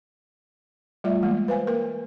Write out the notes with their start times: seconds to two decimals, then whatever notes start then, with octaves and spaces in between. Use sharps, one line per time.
1.04 G3 A3 F4 D5 E5
1.21 E3 G#3 A#3
1.48 B4 C5 F5 G#5
1.67 A#3 A#4